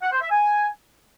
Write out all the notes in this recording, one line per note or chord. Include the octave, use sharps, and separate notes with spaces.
F#5
C5
E5
G#5